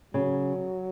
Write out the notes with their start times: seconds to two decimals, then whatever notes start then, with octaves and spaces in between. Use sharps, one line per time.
0.14 C#3 F#3